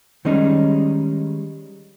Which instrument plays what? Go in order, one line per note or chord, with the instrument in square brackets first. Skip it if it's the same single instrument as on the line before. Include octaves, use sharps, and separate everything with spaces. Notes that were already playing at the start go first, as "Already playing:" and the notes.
[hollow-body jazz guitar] D#3 G3 G#3 C#4 D#4